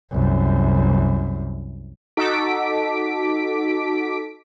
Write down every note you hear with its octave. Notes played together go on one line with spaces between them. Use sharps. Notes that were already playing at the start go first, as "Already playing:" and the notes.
C2 F#2
D#4 F#4 A4 D6 B6 D7